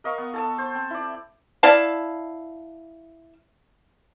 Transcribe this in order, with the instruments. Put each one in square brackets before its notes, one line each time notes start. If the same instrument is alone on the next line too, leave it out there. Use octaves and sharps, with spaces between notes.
[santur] A#4 D#5 F5 C#6
B3
A4 A5 E6
C5
C4
E4 D5
[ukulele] E4 D5 F5 A5